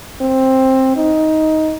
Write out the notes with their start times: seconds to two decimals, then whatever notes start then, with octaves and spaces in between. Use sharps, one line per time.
0.21 C4
0.96 D#4